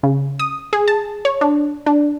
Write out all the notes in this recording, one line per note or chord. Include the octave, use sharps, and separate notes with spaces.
C#3
D#6
G#4
A5
C#5
D4
D4